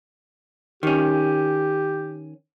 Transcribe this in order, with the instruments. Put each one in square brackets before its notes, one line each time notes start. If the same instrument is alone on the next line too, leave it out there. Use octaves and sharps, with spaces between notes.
[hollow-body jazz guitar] D#3 C#4 [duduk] G4